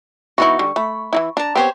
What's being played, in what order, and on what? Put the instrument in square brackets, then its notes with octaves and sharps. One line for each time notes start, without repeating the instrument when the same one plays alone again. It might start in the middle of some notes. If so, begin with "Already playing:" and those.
[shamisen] E3 B3 E4 [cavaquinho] D#4 F#4 [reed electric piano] C#6
[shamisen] D3 G3
[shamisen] A3 [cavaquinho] B5
[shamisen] E3 D#4 E4
[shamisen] D4 [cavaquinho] A5 A#5
[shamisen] B3 C4 [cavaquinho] G4 C5 C#5